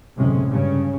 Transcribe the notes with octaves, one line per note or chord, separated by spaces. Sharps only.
F#1 D2 A2 C3 G#3 C#4
G2 C#3 C#4